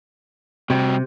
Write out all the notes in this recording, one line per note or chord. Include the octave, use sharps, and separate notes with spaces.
C3 G3 F#4 G5